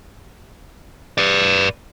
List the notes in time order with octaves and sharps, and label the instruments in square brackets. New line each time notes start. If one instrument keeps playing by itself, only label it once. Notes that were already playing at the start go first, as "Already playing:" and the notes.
[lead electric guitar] B4 D5